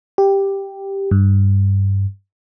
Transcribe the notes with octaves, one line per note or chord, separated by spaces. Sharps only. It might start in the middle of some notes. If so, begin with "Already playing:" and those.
G4
G2